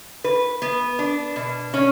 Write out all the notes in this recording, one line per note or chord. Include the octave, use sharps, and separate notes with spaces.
B4
B3
D4
B2
C#4